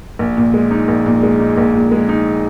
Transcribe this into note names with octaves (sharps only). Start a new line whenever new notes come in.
A#1
A#2
G#3
D#4
A#1
A#2
G#3
D#4
A#1
A#2
G#3
D#4